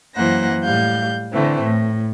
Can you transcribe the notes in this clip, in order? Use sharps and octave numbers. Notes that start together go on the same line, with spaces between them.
F#2 E3 A#3 C5 F#5 A#6
A2 G3 F5 G6
D3 E3 A3 C4
A2